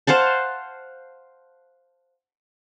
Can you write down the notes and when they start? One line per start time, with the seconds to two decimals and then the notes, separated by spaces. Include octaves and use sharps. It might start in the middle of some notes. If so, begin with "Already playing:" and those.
0.07 C5 F5 F#5 A5